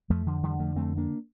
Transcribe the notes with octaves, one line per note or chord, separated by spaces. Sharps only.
F2 F3 A3
D3 F3
D3 E3 G3
F3 A3
F2 A3 C4
A#3 D4